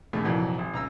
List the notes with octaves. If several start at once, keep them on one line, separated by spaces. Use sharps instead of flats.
A#1 D#2 C#3 A3 A#3
C2 F2 A#2 E3 F#3
G#1
C#2 A#5 E6